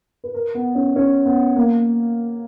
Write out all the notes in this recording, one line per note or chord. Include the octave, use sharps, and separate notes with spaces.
B4
A#4
B3
C#4
C#4
B3
A#3